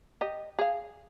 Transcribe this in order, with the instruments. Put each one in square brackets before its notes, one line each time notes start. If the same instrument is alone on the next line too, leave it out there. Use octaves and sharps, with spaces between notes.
[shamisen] G4 D#5
G#4 F5